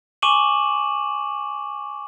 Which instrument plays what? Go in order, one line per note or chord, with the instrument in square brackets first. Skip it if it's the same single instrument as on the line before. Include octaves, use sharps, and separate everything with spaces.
[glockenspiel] G#5 C#6 D6 D#7 E7 F#7